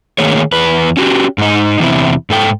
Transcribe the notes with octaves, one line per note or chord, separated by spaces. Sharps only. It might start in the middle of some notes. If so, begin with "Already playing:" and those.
D#3 A3 A#3 G#4 C#5
E2 B4
C#4 F#4 G4
G#2 D#4
E2 C3 E4
G#2 A4 G5